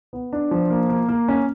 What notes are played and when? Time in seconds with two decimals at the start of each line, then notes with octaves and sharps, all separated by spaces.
0.13 B3
0.33 D4
0.51 F3
0.70 A#3
0.89 A#3
1.09 A#3
1.28 C#4